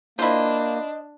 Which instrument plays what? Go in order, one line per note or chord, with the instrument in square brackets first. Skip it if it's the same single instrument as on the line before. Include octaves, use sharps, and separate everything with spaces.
[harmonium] A#3 [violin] D4 [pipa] E4 F4 [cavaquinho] C5 D#5